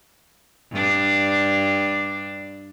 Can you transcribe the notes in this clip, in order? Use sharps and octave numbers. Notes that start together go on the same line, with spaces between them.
G2 D4